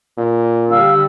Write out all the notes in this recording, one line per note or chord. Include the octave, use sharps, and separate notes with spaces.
A#2
D3 G3 F5 E6